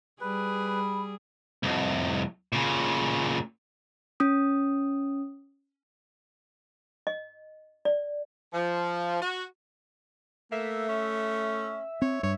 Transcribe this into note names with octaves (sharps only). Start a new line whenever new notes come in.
G3 G#4 B4
B5
C2 F2
A#2 C#3
C#4 D#6
D#5
D5
F3
F#4
A3 A#3 E5
C#4
C4 C#5
G2 C#5